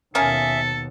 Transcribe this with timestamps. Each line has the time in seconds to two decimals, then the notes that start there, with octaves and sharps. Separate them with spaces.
0.15 D#2 B2 A#3 C#4 G#4 A4 E5